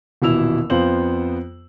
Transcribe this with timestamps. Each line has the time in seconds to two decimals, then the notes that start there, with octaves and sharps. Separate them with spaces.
0.22 D#1 B2 E3 E4 E6 F7
0.70 F2 B3 F4 C5 F#7